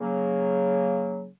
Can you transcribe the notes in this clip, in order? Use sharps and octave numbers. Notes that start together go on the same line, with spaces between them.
C#3 F#3 A#3